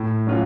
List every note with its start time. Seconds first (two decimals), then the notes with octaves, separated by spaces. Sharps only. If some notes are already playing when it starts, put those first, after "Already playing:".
Already playing: A2
0.27 F#3 C#4 F4